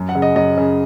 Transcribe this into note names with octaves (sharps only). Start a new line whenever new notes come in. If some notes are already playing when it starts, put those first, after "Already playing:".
Already playing: F#2
F#5
C#3
D#5
F#2 D#5
C#3